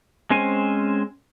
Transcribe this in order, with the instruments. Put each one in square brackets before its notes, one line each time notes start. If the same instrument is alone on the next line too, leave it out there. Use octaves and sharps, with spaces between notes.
[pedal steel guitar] G#3 C4 C#4 C5 G#5